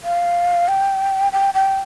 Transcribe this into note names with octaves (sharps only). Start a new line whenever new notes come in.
F5
G5
G5
G5